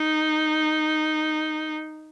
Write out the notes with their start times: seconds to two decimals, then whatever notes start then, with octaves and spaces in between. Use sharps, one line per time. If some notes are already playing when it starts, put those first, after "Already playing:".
Already playing: D#4